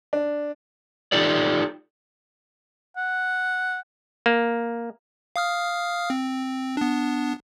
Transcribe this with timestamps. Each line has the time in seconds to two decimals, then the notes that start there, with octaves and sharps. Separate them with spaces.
0.13 D4
1.12 D#4 F4 G4 A4 D5
2.97 F#5
4.26 A#3
5.36 F5 D#6 F6
6.10 C4
6.77 B3 D4